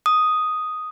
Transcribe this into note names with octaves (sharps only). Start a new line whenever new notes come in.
D#6